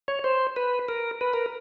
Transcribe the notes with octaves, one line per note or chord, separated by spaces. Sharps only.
C#5
C5
B4
A#4
B4
A#4